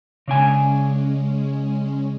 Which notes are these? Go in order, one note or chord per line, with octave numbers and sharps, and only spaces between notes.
C#3 G#3 C#4 D4 G#5